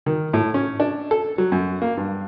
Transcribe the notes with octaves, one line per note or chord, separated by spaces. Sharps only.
D#3
A2
C#4
D4
A4
F#3
F#2
A#3
G2